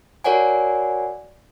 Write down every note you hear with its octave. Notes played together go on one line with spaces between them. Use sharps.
F#4 A#4 C#5 D5 F#5 G#5